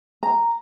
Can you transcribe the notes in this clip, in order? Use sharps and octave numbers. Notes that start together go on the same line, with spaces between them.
A#5